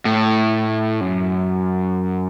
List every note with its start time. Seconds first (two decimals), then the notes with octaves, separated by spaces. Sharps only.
0.05 A2
1.01 F#2